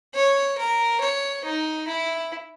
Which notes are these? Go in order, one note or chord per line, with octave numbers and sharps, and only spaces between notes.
C#5
A#4
C#5
D#4
E4